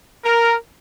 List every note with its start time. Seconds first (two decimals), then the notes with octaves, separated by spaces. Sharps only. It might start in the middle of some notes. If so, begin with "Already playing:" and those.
0.24 A#4